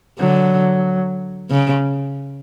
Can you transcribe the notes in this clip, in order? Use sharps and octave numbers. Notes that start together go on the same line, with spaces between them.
D3 F#3
C#3